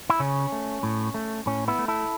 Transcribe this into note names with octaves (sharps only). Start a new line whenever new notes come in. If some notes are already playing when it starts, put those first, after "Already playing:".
E4
C#3 C#4
A3
A2
A3
A2 C#4
B3 E4
A3
E4 A4